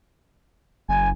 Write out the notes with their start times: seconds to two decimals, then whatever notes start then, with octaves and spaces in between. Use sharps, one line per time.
0.89 F#1 G#5